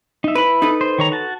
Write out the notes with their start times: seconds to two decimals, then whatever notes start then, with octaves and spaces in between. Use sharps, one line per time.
0.24 D#4 E5
0.35 E4 B4 B5
0.62 D#4 A4 B4
0.81 C5
0.98 D#3 C#5 A#5
1.12 F#4 A5